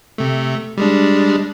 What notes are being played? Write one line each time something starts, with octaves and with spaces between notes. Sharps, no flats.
C3 A3
G3 G#3 D4